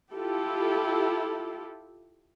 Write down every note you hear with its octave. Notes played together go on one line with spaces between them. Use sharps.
E4 F4 G4 A4